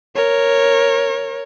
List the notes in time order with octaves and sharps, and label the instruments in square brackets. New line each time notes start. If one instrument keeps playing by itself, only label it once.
[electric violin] A#4 C#5